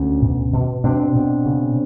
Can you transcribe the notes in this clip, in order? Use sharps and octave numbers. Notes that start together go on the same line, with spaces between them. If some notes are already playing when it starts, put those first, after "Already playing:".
Already playing: D2 C#4
B2
B2
B2 C4 D4
B2
C#3